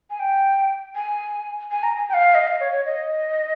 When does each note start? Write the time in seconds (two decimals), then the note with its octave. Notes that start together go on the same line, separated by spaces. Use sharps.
0.10 G#5
0.19 G5
0.95 G#5
1.71 G#5
1.83 A#5
1.96 G#5
2.09 G5
2.14 F5
2.35 D#5
2.47 F5
2.60 C#5
2.72 C#5
2.85 D#5